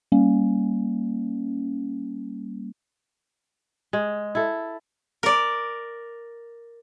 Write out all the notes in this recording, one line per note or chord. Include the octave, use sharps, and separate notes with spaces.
G3 A#3 C#4
G#3
E4 A4
A#4 D5